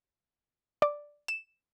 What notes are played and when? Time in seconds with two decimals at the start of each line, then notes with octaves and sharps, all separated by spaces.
0.82 D5
1.28 E7